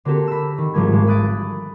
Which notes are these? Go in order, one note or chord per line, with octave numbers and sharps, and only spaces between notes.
D3 A#3 C4 F#4 G4 A4
B5 E6
D#3
G#1 G#2 F3 G3 A#3 G#6
F3 G#3 A#3
B5 D#6 F#6 A6 D7